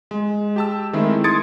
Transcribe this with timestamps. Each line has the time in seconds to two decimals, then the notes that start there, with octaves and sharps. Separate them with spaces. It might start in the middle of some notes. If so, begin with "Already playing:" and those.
0.11 G#3
0.56 G4 A5 E6
0.93 D#3 G#3 A3 C4 E4
1.24 C6 D#6 G#6 A6 C#7 D7